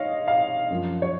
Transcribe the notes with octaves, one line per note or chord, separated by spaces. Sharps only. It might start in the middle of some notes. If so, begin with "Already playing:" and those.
Already playing: G#2 C#5 D#5 F5
F5
F#2 F3
C#5